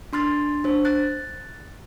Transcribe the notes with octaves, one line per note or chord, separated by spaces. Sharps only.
D4 C6 F6 A6
D4 C5
F#6 A6